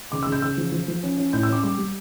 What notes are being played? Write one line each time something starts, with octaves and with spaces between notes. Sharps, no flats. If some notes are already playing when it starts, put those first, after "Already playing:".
C#3 D6
E6
C#3
G6
C#3 E6
F3
F3
F3
C#4
C#4
A2 G6
E6
C#4 D6
G3 D6
G3